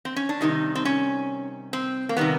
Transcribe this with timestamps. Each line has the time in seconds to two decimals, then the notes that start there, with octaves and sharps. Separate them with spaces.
0.05 C4
0.16 C#4
0.29 D4
0.41 C3 D#3 G3 D#4
0.75 C4
0.85 C#4
1.73 C4
2.09 A#3
2.17 C3 D#3 G3 B3